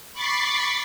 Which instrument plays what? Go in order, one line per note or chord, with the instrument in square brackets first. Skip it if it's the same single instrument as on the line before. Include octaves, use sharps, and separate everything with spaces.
[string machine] B5 C#6 D6 A6 B6 C7